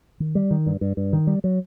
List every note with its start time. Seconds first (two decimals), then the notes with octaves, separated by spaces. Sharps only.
0.20 D#3
0.35 G3
0.51 D#3
0.66 G2
0.81 G2
0.97 G2
1.13 D#3
1.27 G3
1.44 F#3